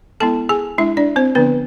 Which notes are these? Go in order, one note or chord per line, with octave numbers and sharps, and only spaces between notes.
G#3 B3 E4 A4 A5
G#4 G#5
G#3 D4 E4 E5
D4 D5
C4 C5
D3 F3 B3 D4 B4